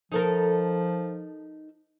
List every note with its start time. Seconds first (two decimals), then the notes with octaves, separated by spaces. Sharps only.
0.12 F3 D#4 A4 A#4